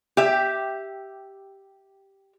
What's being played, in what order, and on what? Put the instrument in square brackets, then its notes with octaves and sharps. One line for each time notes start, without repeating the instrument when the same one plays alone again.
[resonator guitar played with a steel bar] G4 E5